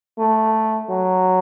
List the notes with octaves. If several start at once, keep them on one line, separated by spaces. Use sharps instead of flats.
A3
F#3